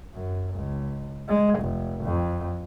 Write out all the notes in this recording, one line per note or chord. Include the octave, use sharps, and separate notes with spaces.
F#2
C#2
G#3
F1
F2